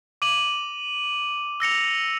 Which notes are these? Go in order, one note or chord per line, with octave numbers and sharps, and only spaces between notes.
D6 D#7 F#7
E6 A#6 C#7 F7